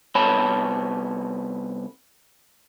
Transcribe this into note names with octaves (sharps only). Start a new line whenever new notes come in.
C2 B3 C#5 A5 B5